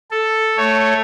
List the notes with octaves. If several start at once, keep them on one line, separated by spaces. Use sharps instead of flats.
A4
A3 C#5